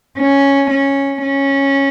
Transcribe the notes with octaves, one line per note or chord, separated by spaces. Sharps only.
C#4
C#4
C#4